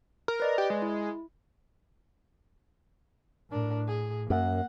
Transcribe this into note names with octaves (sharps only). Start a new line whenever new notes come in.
A#4
B4 D5 D#5
G4
G#3
E4
A2 D4 A#4
G#4
F#2 A#3 F#5